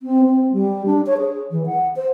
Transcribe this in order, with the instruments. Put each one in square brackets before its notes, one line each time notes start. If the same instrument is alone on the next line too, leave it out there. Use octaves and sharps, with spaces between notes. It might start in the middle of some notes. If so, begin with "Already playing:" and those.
[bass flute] C4
C4
G3
D4
C#5
G#4
E3
F#5
C5